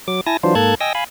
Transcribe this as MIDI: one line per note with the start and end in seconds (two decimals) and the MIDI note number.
0.08 0.21 54
0.08 0.21 86
0.27 0.37 64
0.27 0.37 80
0.27 0.37 81
0.27 0.37 94
0.43 0.55 52
0.43 0.55 54
0.43 0.55 62
0.43 0.55 65
0.43 0.55 72
0.55 0.75 44
0.55 0.75 58
0.55 0.75 69
0.55 0.75 81
0.55 0.75 90
0.55 0.75 92
0.80 0.93 75
0.80 0.93 79
0.80 0.93 80
0.80 0.93 88
0.80 0.93 94
0.95 1.04 77
0.95 1.04 80
0.95 1.04 83